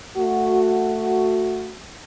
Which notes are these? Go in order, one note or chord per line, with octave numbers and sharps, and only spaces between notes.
A3 F#4